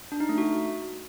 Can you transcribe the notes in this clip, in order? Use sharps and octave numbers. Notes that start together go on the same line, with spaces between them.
D4
D#4
A3
F#4